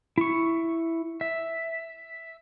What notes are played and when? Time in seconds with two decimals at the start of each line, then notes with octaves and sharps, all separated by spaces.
0.18 E4 C#6
1.21 E5